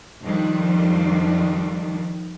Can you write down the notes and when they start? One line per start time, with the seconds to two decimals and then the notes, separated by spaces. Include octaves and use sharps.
0.23 F2 D#3 F3 G3 D4